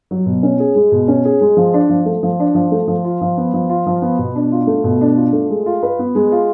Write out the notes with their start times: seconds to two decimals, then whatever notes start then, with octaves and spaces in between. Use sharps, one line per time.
0.11 F#3
0.26 B2
0.43 C#4
0.60 G#4
0.75 G#3
0.92 B2
1.08 C#4
1.25 G#4
1.41 G#3
1.57 F3
1.74 D4
1.89 F3
2.06 A3
2.23 F3
2.40 D4
2.55 F3
2.72 A3
2.88 F3
3.05 F4
3.21 F3
3.37 B3
3.54 F3
3.69 F4
3.86 F3
4.02 B3
4.19 B2
4.35 D4
4.52 F4
4.67 A3
4.84 B2
5.01 D4
5.16 F4
5.33 A3
5.50 G#3
5.66 F4
5.83 B4
5.99 B3
6.15 G#3
6.32 F4